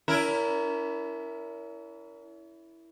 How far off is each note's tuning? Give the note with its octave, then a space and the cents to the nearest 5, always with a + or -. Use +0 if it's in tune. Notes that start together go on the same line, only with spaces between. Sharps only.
C#4 +45 E4 +0 A#4 +0